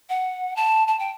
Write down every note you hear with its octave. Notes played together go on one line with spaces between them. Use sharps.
F#5
A5
A5
G5